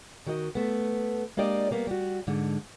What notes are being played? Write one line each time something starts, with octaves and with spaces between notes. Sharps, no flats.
D#3 F#4 A#4 D#5
A3 B3
G#3 A#3 D4 G4 D5 D#5
G3 A#3 B3
G3 F#4
G#2 D3 G#3